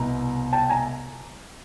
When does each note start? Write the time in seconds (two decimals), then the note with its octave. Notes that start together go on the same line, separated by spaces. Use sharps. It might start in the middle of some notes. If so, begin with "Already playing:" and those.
Already playing: C2 B2 A#5
0.53 G5 A5
0.70 G#5 A#5